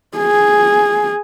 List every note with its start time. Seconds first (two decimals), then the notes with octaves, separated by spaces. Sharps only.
0.17 G#4